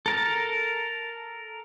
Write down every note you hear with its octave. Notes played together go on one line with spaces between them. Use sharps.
A4 A#4 A5